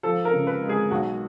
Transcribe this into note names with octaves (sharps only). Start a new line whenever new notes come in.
F3 A4
A#4
C#3
B4
G#3
G#4
B1 F#4